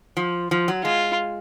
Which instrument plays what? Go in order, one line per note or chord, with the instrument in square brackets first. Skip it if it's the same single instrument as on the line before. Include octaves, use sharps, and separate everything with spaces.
[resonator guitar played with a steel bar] F3
F3
F#3
[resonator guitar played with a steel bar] G#3 [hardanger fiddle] F4